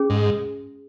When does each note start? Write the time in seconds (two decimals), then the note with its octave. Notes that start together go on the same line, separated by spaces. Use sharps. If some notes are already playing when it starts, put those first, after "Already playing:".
Already playing: C#4 G#4
0.10 G#2